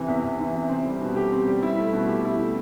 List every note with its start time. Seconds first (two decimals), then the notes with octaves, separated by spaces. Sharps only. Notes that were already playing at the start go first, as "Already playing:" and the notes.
Already playing: C3 E3
0.08 E2
0.23 E2
0.39 E3
0.55 C3
0.69 C4
0.85 G3
1.01 B2
1.16 G4
1.32 C4
1.48 G3
1.63 E4
1.78 A3
1.93 B2
2.08 G4
2.25 E4
2.39 A3